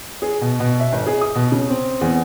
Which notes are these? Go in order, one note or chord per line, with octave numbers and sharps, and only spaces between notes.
G#4
B2
B2
E5
G#1
G#4
D#6
B2
C#3
C4
E2